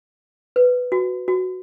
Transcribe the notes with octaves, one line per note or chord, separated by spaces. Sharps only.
B4
F#4
F#4